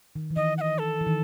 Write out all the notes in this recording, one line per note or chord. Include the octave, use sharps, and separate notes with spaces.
D#3
E3
D#3 D#5
F#5
D#5
A4
E3
D#3